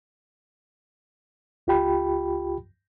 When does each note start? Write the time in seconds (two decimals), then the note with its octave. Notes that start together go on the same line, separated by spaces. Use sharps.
1.67 C#2 F4 G4 G5 B5